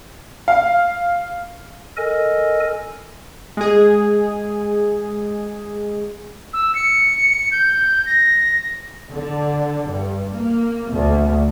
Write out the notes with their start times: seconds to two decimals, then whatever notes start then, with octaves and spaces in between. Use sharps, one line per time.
0.48 F5
1.97 A4 A#4 D#5 G#5
3.57 G#3 G#4
6.53 E6
6.75 C#7
7.52 G6
8.06 A#6
9.12 D3
9.88 G2
10.33 A#3
10.91 D2